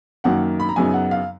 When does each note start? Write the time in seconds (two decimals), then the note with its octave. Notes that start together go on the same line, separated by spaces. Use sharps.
0.24 F#2 D#3 F#3 A#3 F#5
0.60 B5
0.69 A#5
0.76 F#2 C#3 F#3 B3 D#4 G#5
0.94 F#5
1.11 F5